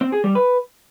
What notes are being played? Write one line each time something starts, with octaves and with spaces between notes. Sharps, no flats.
C4
G#4
G3
B4